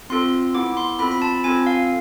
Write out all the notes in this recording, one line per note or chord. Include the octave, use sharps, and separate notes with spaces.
C4 F4 A4 C6
B3 E4 A4 D6
C6
C4 F4 A4 B5
B5
A5
C4 F4 A4 G#5
F5